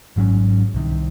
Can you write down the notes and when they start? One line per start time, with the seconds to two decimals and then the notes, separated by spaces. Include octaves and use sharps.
0.16 G#1 G#2 F#3 C#4
0.74 C2 C3 D#3